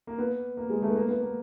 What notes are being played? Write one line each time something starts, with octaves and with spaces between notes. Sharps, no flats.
A#3
B3
A#3
G#3
A3
B3
A#3
B3
A#3